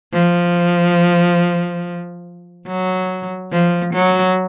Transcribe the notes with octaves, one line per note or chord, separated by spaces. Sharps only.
F3
F#3
F3
F#3